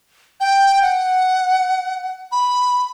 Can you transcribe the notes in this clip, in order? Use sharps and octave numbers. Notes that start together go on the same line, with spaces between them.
G5
F#5
B5